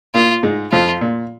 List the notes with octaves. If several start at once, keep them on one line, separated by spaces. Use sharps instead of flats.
A#2 A#3 F4
G#2 G#3
F2 F3 F4
A#2